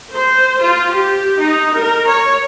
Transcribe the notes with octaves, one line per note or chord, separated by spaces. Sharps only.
C5
F4
G4
D#4
A#4
C#5